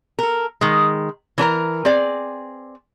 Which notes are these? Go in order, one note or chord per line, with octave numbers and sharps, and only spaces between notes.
A4 A#4
D#3 G#3
E3 D4 A#4 A#5
C4 G#4 D5